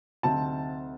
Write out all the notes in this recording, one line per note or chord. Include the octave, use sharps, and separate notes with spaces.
D2 C3 F#3 C4 D#4 A5